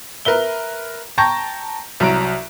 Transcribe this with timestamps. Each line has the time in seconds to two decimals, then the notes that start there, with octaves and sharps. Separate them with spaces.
0.25 A#4 B4 E5 G7
1.18 G5 A5 A#5 C#6 G6 A#6
2.00 C2 F#3 A#5 D7